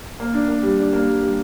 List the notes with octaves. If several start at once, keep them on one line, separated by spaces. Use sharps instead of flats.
A#3
D4
A#3
G3
D4
A#3
G3
G3